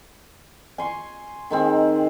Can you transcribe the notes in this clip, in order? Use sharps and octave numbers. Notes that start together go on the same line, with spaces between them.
G#5 C6 C#6
D#3 G#3 C4